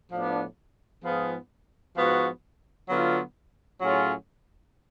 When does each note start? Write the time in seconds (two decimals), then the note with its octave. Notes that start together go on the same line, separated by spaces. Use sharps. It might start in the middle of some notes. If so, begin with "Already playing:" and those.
0.11 A2 F3 B3 D4
1.04 G#2 F3 B3 F4 G#4
1.96 G#2 F3 B3 F#4
2.88 D3 F#3 B3 F4
3.80 A2 F#3 C#4 F4 G#4